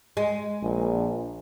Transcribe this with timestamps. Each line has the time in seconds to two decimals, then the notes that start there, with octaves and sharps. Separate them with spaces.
0.17 G#3
0.62 A#1